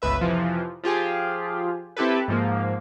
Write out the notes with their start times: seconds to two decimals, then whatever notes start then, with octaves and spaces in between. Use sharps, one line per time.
0.02 G1 C#2 B4 E5
0.21 F2 C3 E3 F3
0.83 F3 F4 G4 G#4
1.97 C4 E4 G4 A4 B4
2.28 G#2 F3 A#3